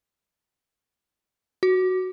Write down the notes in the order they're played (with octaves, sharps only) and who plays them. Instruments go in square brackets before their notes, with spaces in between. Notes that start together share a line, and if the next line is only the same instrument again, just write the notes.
[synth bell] F#4